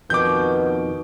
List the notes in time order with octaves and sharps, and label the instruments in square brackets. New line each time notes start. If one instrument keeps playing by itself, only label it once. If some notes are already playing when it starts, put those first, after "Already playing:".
[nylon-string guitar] F2 D#3 [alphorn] B2 [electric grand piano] D6 G6